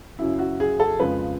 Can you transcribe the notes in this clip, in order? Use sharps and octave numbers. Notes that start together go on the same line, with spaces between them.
F#2 C#3 F#3 E4
F#4
G#4
A4
F2 C#3 F3 G#3 B4